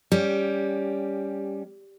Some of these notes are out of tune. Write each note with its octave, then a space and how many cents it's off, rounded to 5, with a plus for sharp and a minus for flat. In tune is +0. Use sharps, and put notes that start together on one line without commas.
G3 +15 C#4 +20 G4 +0